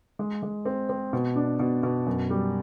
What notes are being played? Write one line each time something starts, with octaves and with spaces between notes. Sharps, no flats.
G#3
G#3
C4
C4
B2
D4
B2
B2
F#2
G3